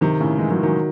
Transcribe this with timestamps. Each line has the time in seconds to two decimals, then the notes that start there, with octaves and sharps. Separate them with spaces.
0.01 C3 D#3
0.20 A2 C#3
0.38 E3 G#3
0.50 D#3 F#3
0.63 D#3 F#3